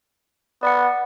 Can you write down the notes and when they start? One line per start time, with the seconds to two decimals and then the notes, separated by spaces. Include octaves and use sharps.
0.63 B3 D5 F#5